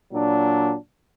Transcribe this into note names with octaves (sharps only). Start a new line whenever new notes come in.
A#2 F#3 D4